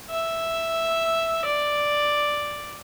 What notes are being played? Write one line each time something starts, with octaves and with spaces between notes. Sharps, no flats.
E5
D5